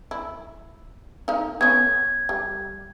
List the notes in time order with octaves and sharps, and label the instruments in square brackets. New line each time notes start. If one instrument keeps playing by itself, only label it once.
[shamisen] E4
D#4 F5
[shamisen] B3 C#4 [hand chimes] G#6
[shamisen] G3